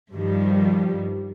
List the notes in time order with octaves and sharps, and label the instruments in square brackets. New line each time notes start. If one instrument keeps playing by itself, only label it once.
[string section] G2 D#3 F3 G3